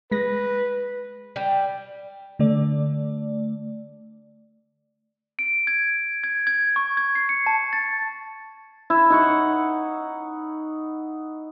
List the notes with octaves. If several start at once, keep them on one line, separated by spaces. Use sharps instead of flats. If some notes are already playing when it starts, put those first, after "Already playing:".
G#3 B4 A#6
G3
D3 A3 D5
D7
G#6
G#6
G#6
C#6
G#6
C7
C#7
A5
A6
E4
D#4 F#5 C#6